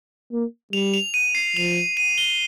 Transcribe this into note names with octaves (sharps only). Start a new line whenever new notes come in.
A#3
G3 F7
F7
D#7
C7
F3 F7
D#7
G7